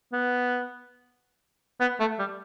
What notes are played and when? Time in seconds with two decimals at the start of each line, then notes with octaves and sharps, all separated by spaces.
0.13 B3
1.81 B3
2.00 A3
2.19 G3